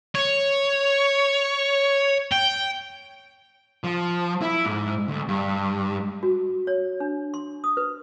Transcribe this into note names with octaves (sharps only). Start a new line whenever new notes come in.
C#5
G5
F3
E4
G#2
D2
G2
F#4
C#5
D4
C6
D#6
B4